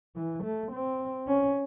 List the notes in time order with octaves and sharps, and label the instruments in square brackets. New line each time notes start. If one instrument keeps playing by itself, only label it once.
[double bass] E3
A3
C4
C#4